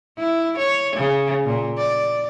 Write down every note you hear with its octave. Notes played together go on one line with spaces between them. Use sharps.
E4
C#5
C#3
A#2
D5